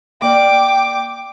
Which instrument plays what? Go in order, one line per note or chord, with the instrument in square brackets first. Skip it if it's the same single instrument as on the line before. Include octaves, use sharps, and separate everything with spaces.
[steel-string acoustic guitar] A#3 D5 F5 [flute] G5 [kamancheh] D6